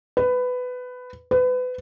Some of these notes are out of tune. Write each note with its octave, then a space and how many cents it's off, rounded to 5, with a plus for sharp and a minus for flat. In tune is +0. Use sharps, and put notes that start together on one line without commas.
B4 +15
B4 +30